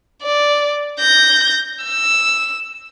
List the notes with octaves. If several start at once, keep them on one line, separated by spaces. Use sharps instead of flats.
D5
G6 A#6
E6